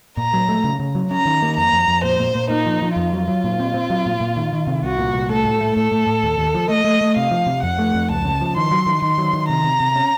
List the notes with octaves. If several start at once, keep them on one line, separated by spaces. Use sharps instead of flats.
A#2 A#5
F#3
A3
C#3
C#3
F#3
C#4 A#5
D#3
A#3
F2 A#5
F2
F2
A#2 C5
A#2
A#2
A#3 D#4
F3
F3
F2 F4
F#3
F#3
A#2
C4
C4
F#3
A#2
A#2
D#3
D#3
C3
C2 F#4
A#2
C2
A3 A4
A2
A3
A2 A4
A2
A2
D#2
D#2
F3
A3 D#5
A3
A3
C3 F5
F3
C3
F2 F#5
A3
F2
C#2 A5
C#3
F3
D#3 C6
F#3
D#3
D#3 C6
F#3
D#3
C3 A#5
C3
C3
C#4